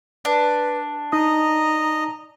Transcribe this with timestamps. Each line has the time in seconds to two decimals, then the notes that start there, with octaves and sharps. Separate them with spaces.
0.25 D4 B4
1.12 D#4 D#5 A#5 D#6